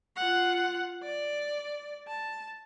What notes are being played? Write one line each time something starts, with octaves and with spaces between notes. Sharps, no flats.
F4 F#5
D5
A5